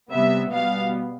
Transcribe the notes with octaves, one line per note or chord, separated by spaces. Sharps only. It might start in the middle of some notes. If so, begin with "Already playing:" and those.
C3 G3 B3 E5
B2 G3 B3 F5